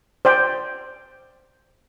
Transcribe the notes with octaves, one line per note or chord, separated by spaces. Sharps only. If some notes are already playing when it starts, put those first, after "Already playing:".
C5 D5 G5